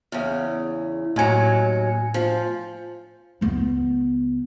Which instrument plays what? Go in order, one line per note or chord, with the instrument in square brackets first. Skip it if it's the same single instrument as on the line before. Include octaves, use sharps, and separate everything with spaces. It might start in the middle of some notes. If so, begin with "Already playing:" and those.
[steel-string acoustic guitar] E2 C#3
[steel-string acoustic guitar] D#2 F#3 [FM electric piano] A2 G#5 C#7
[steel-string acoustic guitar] F3
[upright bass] C#2 B3